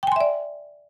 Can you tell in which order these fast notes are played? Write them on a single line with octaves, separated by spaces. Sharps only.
G5 G#5 C6 E5 D5